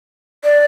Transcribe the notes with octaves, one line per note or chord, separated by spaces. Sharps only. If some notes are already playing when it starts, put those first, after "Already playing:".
D5